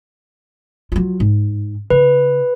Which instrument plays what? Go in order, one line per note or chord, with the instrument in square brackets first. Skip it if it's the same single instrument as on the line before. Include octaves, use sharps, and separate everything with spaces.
[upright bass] F#3 F4
G#2
[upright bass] C#3 [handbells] B4